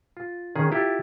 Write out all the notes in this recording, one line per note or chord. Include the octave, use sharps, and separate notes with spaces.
F4
D#3 C#4 G#4
E4 F4 G4 A4